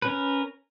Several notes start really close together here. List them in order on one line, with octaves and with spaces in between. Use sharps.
B4 C#4 A#4